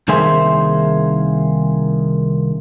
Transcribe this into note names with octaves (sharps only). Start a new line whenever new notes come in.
C2 D#3 A#3 G#4 C5 E5